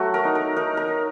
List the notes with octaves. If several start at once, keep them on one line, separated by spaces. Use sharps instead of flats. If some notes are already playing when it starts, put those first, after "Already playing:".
Already playing: F#3 A3 F#4
A#4
D#4
A#4
D#4 A#4
A#4
D#4